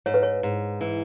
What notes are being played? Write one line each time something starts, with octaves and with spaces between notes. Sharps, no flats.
G#2 C#5
B4
C#5
G#2
E3